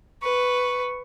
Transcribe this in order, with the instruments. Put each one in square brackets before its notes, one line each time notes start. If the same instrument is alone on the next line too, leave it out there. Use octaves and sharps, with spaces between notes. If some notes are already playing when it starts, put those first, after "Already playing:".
[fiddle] B4 [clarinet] C#6